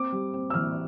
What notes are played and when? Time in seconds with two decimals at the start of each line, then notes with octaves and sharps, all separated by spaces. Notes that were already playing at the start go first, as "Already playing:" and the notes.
Already playing: C4 D6
0.12 G3
0.34 C4
0.50 E6
0.54 E3 F6